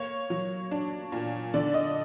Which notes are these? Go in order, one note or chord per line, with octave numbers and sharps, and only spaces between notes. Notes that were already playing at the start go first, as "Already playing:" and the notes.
Already playing: A#3 C#5
F#3
D4
A#2
D3 D5
D#5